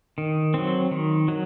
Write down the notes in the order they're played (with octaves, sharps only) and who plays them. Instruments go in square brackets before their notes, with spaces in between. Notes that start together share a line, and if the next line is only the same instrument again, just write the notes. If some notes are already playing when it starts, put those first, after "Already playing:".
[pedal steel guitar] D#3
F#3 C4
D#3
F#3